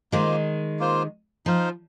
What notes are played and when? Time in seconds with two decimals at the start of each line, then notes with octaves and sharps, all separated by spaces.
0.12 D#3 G#3 A#3 F4 C5
0.79 A#3 F4 C5
1.46 F3 D#4 C5 F5